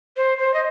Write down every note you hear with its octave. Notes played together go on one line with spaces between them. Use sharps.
C5
C5
D#5